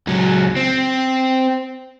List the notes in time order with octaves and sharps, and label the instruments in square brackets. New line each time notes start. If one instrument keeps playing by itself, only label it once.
[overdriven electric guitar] C#2 F#3
C4